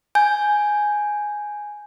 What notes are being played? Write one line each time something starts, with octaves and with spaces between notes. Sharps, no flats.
G#5 G6